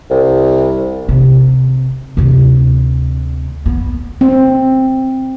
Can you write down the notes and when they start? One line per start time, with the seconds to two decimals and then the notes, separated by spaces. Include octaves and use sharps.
0.11 C2
1.09 C3
2.17 D2 C3
3.66 B3
4.21 C4